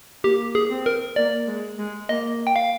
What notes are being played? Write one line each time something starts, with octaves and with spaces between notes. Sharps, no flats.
A#3 G4
G#4
C4
A#4
A#3 D5
G#3
G#3
A#3 D#5
G5
F5